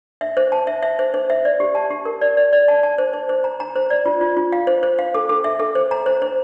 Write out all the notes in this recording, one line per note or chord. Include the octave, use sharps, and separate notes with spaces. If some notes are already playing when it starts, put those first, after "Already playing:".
E5
C5
A5
E5
E5
C5
C5
E5
D5
G4
A5
G4
A#4
D5
D5
D5
A5
A5
C5
C5
C5
A#5
A#5
C5
D5
F4
F4
F4
F5
C5
C5
F5
A4
A4
E5
A4
C5
A#5
C5
C5